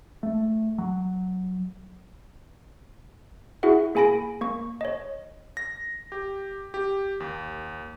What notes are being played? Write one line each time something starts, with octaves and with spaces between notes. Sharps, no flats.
A3
F#3
E4 F#4 G#4 E5 F#5
A#3 G#4 G#5 B5 A#6 D7
A#3 C#6
C#5 D#5
A#6
G4
G4
D#2